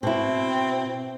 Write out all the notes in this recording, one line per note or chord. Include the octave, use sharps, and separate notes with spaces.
B2 C4 E4